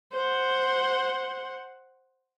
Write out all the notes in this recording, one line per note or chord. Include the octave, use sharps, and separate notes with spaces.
C5 F#5